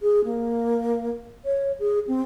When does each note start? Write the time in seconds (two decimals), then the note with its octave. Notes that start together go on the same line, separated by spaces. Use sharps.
0.02 G#4
0.24 A#3
1.45 C#5
1.79 G#4
2.08 C4